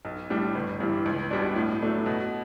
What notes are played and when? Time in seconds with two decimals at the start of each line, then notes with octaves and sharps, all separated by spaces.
0.05 B1
0.30 A2 G3 D4
0.55 G1
0.80 G2 E3 G3
1.06 C#2
1.31 B2 G3 D4
1.56 A2
1.82 F#3 A3 D4
2.06 B2